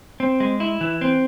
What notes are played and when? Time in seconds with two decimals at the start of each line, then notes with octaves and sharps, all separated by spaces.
0.20 C4
0.40 G#3
0.60 E4
0.81 E3
1.01 C4